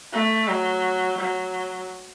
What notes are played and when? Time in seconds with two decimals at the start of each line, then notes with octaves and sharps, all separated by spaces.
0.13 A3
0.48 F#3
1.18 F#3